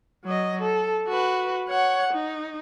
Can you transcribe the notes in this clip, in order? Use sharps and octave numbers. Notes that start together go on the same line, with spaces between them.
F#3 D#5
A4
F#4 B4
C#5 F#5
D#4